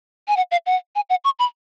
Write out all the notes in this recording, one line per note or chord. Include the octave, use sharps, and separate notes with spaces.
G#5
F#5
F5
F#5
G#5
F#5
C#6
B5